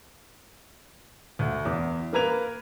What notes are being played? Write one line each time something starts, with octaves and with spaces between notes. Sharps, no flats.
D2
E2
A#3 A#4 B4 A#5 G#6 F7